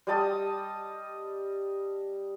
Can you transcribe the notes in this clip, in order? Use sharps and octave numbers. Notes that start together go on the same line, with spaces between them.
G3 D#5 A5 D#6